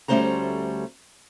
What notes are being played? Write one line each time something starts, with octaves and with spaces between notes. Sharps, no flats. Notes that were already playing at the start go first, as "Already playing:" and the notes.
D2 G3 A3 C#4 C5 A#5